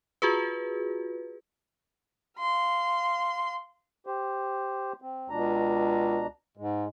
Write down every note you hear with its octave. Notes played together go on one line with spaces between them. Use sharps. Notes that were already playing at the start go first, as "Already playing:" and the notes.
F4 F#4 G#4 B4
F5 C6
G4 C5
C4
C#2 B2 D4 A#5
G#2 G#3